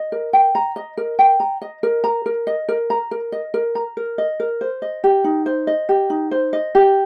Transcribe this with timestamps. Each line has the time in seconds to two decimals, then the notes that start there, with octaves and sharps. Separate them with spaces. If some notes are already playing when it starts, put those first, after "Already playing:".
Already playing: D#5
0.12 A#4
0.33 G5
0.55 A#5
0.76 D#5
0.97 A#4
1.19 G5
1.40 A#5
1.62 D#5
1.83 A#4
2.04 A#5
2.26 A#4
2.47 D#5
2.69 A#4
2.90 A#5
3.11 A#4
3.32 D#5
3.54 A#4
3.75 A#5
3.97 A#4
4.18 D#5
4.40 A#4
4.61 C5
4.82 D#5
5.04 G4
5.24 D#4
5.46 C5
5.67 D#5
5.89 G4
6.10 D#4
6.31 C5
6.53 D#5
6.75 G4